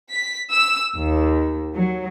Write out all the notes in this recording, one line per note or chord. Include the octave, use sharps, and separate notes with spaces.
B6
E6
D#2
F#3